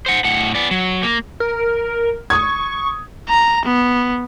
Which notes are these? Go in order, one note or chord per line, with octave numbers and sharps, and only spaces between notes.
C5 F#5
A2 F#5
B3 D5
F#3
A#3
A#4
C#6 D#6 G#6
A#5
B3